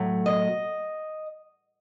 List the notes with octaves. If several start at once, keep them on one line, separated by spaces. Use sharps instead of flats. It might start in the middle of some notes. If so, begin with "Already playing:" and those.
Already playing: A2 F#3 A3
D#5